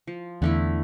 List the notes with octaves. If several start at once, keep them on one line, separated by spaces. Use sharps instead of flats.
F3
E2 D3 A3 E4